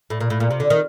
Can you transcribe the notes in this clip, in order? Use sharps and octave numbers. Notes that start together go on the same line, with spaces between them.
A2
A#2
A2
A#2
C3
D3
D#3